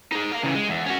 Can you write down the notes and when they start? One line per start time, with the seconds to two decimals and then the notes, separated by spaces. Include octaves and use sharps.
0.12 D#4 G#4
0.32 F5 A#5
0.43 C#3 E3
0.55 G#3
0.69 E2
0.86 C#4 F#4